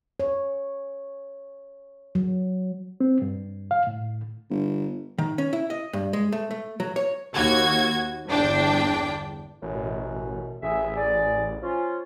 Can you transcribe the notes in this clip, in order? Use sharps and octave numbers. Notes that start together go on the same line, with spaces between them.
C#5
F#3
C4
G2
F5
A2
G1
D#3
C#4
E4
D#5
G2
G#3
A3
A3
F#3
C#5
D#2 F#4 G#6
G1 E2 D4 G5
A1 F#2 B2
A1 G#4 E5
G#4 D5
F3 C#4 F4